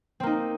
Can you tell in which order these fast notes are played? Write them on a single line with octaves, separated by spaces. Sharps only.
C4 A#3 D#4